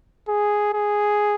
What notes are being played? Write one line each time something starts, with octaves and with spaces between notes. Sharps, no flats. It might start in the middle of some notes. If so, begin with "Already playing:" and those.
G#4
G#4